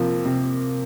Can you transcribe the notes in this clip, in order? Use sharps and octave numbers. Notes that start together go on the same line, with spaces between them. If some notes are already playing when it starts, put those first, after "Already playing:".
Already playing: C3 F3 A#3
C3